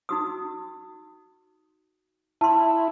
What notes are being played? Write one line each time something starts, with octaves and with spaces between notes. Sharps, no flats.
D#4 F#4 D#6
E4 A5 C6